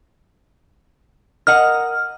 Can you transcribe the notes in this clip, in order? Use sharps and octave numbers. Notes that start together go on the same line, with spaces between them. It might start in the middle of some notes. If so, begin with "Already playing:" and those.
A#4 D#5 F#5 F6